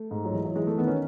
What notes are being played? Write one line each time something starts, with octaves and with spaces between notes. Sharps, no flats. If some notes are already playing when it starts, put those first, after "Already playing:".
Already playing: A3
G#2
F#3
E3 G#3
F#3
E3 G#3
A3
D#3 B3
C#4